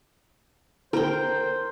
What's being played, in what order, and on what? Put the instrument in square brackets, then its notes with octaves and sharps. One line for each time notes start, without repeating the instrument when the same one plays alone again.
[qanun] A#4 G5 [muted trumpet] C5